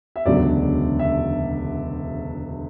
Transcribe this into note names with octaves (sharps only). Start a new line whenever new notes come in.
E5
E1 D2 C#3 F#3 D5
E5